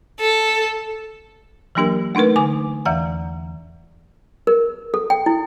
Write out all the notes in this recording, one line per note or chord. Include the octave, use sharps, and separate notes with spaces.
A4
E3 F#3 A#3 D4 G4 A#4
A3 D4 D#4 A#4 B4
D3 G#5 D6
E2 E3 E5 F#5 A#5
A#4
A4
G5
E4